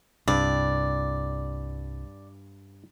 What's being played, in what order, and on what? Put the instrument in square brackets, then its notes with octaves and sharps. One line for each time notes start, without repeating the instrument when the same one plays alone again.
[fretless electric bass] C2 [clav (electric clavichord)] G2 [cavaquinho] D5